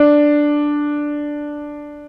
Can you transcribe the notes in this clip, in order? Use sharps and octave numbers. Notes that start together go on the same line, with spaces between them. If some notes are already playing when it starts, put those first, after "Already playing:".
Already playing: D4